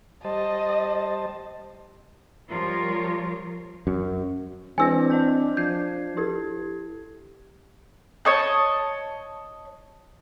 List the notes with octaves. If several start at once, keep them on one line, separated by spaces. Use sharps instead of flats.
G3 C5 D#5 A5
F3 G3 F4 A#4 C#5
F#2
E3 C4 D4 E4 B4 G#5 E6 A#6
D#5 A5 G6
F3 G6 G#6 C7
E4 G4 A4 G#6
C#5 D#5 A5